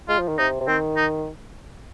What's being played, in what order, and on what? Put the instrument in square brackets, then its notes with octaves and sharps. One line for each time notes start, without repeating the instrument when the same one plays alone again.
[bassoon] G#3 [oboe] F4
[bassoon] F3
D#3
[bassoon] C3 [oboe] D#4
[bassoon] C3
[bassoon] D#3 [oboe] C4
[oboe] D#4